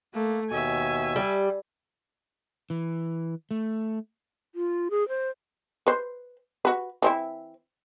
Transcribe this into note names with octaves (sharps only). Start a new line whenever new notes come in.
A3 A#3
D#2 B2 E5 G#5
G3
E3
A3
F4
G#4
C5
B4 C5
F#4 B4
E3 C4 E4